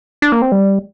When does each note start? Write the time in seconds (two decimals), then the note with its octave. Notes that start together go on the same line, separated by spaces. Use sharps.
0.22 D4
0.32 A#3
0.42 C4
0.52 G3